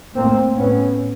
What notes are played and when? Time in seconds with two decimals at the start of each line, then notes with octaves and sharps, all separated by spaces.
0.15 A2 A#3 C4
0.58 A2 B3 C#4